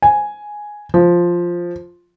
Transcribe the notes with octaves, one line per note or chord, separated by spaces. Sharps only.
G#5
F3